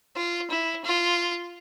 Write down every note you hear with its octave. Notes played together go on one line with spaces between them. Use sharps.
F4
E4
F4